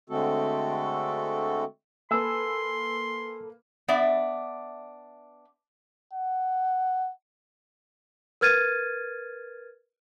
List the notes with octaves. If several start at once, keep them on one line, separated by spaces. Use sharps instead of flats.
D3 G#3 A3 C4 F#4 A4
A#3 A4 B4 G#5 C6 E6
B3 D4 D5 E5
F#5
A#4 B4 F6 G#6 A6 D#7